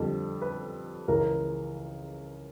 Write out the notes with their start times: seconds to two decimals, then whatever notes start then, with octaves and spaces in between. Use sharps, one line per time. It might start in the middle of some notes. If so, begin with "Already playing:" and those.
Already playing: F2 D3 G3 A4
0.42 B4
1.08 C#2 C#3 E3 A#4